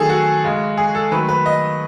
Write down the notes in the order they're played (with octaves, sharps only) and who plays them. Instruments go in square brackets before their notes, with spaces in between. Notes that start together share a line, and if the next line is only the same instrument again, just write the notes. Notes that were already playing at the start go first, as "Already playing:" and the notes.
Already playing: [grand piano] D#3 F#3 A3 G#4 A4
F#4
C#3 G#3
G#4
A4
D#3 F#3 A3 B4
B4
D#5